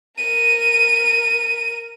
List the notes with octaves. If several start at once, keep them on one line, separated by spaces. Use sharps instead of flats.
A#4 D#7